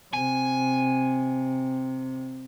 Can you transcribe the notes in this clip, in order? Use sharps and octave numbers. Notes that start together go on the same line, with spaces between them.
C3 G#5